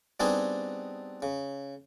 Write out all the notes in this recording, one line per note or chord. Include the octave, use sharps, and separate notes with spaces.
G3 B3 C4 D4 D#4 G#4
C#3